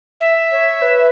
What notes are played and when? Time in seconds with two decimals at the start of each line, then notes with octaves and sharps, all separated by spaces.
0.21 E5
0.51 C#5
0.82 B4